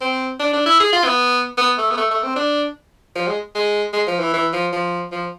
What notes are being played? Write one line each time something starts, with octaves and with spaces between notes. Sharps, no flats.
C4
D4
D4
E4
G#4
F4
B3
B3
A3
B3
A3
A3
C4
D4
F3
G#3
G#3
G#3
F3
E3
E3
F3
F3
F3